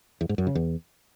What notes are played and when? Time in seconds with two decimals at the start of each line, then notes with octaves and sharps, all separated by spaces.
0.21 E2
0.29 G#2
0.38 F#2
0.47 C#3
0.55 E2